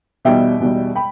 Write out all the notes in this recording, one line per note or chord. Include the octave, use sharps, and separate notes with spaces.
E2 B2 G3 D#4 E5 G5
E2 B2 G3 D#4
G5 B5